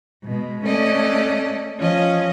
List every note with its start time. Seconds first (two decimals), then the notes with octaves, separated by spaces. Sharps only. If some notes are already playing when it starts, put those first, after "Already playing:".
0.24 B2 G#3
0.64 A3 C#4 A4 D5 D#5
1.79 F3 C#4 F4 D#5